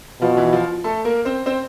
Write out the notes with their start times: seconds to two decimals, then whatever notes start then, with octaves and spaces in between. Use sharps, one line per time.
0.21 B2 F3 F4
0.37 E3 E4
0.53 F3 F4
0.84 A3 A4
1.05 A#3 A#4
1.25 C4 C5
1.46 C4 C5